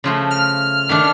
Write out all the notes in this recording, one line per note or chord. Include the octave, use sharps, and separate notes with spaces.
C#3 F3 A3
F6
D#3 A3 D4